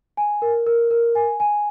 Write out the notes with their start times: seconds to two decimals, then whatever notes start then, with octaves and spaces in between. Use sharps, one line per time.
0.17 G#5
0.42 A#4
0.67 A#4
0.91 A#4
1.15 G#5
1.40 G#5